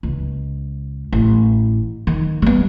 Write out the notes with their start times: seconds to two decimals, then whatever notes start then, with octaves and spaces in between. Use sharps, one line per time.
0.03 C#2
1.13 A1
2.07 D#3
2.42 G3 B3